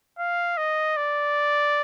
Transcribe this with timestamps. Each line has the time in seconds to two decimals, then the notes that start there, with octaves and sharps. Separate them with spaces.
0.19 F5
0.57 D#5
0.97 D5